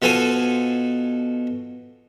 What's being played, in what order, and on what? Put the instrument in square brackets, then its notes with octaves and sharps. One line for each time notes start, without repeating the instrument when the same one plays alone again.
[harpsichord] B2 F4 A4 C5 G#5